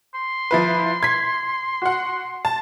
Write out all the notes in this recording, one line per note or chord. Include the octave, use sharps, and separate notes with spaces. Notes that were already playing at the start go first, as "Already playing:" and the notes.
C6
F3 E4 B4
G#6 B6
F#4 F#5
A5